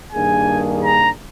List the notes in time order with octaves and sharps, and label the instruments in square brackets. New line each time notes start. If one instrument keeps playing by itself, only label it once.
[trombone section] G2 D#3 A#3 D4 G#4 [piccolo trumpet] G#5
[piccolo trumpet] A#5